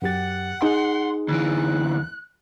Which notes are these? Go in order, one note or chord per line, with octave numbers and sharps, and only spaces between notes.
F#2 G4 F#5 A6
D#4 G#4 C6
D2 E3 F#6